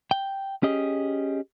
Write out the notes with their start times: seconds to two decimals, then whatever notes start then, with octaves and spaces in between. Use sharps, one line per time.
0.11 G5
0.63 C#4 G4 G#4 D#5